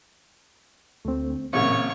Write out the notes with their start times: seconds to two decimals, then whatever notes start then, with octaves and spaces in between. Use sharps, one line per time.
1.05 D2 A3 C4
1.53 A1 A#2 C#3 F#3 A#3 C4 C#5 C#6